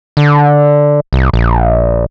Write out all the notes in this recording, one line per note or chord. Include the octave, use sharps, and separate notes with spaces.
D3
C2
A#1